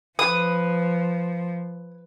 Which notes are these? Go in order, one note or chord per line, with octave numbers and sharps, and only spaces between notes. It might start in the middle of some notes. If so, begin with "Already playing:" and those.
F3 B4 D#6